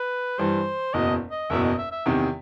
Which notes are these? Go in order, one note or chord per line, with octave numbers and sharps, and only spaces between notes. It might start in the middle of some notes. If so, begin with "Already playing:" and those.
Already playing: B4
G2 E3 G3 C5
F#1 E2 B2 D#5
D#5
F#1 E2 B2 E5
D#5
E5
E5
E2 C3 D#3